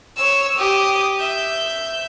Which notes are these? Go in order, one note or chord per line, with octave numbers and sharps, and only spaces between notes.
C#5 E6
G4 D#6
E5 G6